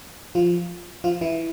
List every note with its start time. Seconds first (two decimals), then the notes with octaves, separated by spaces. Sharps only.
0.35 F3 F4
1.04 F3 F4
1.21 E3 E4